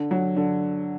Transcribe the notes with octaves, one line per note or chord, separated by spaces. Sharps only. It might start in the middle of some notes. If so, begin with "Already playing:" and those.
Already playing: D3
F#3
D3